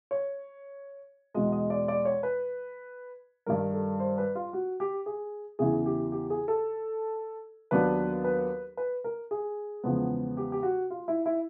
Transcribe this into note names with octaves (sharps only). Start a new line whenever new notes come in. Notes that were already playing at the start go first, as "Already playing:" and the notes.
C#5
E2 B2 G#3 D#5
D#5
D5
D5
C#5
B4
G2 D#3 G3 A#4
A4
C5
B4
F4
F#4
G4
G#4
E2 C#3 E3 G#4
G4
G4
G#4
A4
D#2 D#3 F#3 B3 D4 B4
B4
B4
A#4
G#4
E2 C#3 F3 G#3 B3
G4
G4
F#4
F4
E4
E4